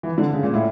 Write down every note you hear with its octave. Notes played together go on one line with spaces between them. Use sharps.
E3
D3
C#3
A#2
A2